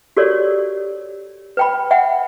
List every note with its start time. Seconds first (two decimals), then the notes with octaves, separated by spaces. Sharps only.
0.17 F#4 G4 A4 A#4 C#5 D5
1.57 B4 G5 B5
1.91 E5 F#5 G5